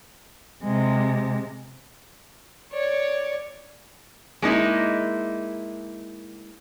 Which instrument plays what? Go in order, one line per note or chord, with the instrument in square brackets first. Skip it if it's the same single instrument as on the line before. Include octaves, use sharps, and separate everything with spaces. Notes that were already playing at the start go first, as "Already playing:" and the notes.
[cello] C3 G#3
[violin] C#5 D5
[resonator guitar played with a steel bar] G#3 A#3 D#4 E4